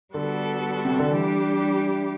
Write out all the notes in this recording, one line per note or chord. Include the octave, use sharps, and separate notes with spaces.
D3 G3 B3 F#4 A4
C3
D3
E3 G3 D4 G4